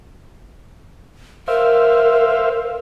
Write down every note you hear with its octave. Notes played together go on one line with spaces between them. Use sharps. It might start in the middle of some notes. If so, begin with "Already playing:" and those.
A#4 C5 E5 F5